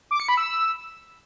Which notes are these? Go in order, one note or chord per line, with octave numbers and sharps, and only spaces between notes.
D6
C#7
B5
E6